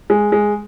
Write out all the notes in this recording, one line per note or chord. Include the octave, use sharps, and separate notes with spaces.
G#3
G#3